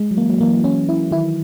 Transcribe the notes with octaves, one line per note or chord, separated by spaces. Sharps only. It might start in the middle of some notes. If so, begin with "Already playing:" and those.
Already playing: G#3
F#3
E3 A#3
F#3
E3 A#3
F#3
E3 C#4
E4
D#3 E4